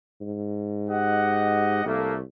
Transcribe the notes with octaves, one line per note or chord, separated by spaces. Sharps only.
G#2
G4 D#5 F#5
C2 A3 A#3